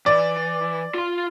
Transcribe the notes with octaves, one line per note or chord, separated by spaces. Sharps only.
E3 D5
F4 C6